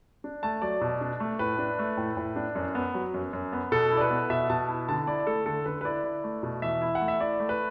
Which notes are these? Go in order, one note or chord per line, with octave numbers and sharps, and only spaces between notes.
D4
A3 A5
F#3 D5
B2
D4
A3
A2 B4
D4
A3
A2
A2
D4
F#2
B3
F#3
F#2
F#2
B3
B2 A4
E4
D5
B4
B3
B2 E5
B2 A5
E4
D3 A5
E4 D5
A3 A4
D3 A4
D3 B4
B4
E4 D5
E4
A3
B2
E2 E5
E4
F#5
A3
E5
E4 D5
A3
B4